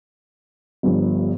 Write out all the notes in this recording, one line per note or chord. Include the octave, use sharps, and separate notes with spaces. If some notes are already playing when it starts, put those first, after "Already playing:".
G1 G2 F3